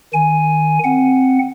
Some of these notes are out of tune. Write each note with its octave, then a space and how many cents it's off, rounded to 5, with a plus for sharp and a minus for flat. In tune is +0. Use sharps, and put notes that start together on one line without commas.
D#3 +0 G#5 +0
C4 +0 F#5 +0